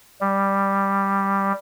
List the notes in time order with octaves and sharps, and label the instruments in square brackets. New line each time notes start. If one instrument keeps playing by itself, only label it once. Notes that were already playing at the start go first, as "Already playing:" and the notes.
[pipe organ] G3